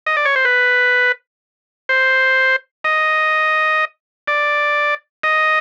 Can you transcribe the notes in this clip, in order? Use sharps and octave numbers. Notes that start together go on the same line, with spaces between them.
D#5
D5
C#5
C5
B4
C5
D#5
D5
D#5